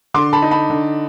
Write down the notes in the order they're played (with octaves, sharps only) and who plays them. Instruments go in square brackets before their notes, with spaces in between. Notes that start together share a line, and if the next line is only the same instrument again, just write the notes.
[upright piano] D3 C6 D6
A5 B5
D#4
A5 B5
D3